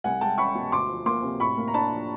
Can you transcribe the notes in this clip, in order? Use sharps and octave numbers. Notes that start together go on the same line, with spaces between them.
C2 F#5 G#5
G#3 G5 A5
C#4 B5 C#6
B2
D2 C6 D6
F3
A#3 C6 D6
C3
A2 B5 C#6
A#3
A#5
D4 A5 B5
F3